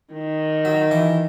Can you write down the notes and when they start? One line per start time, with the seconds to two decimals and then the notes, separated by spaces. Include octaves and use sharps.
0.12 D#3
0.65 F#3
0.91 E3